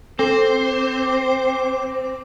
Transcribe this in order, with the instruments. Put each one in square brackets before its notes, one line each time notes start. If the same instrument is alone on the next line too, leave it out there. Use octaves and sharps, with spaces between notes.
[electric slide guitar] C4 [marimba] A4 [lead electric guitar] C5 [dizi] D6